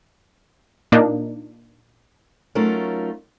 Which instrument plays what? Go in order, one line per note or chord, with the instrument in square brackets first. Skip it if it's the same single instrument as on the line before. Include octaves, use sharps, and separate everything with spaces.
[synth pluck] A#2 A#3 D4 D#4
[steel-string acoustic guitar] F#3 A3 C#4 D#4 F4 A#4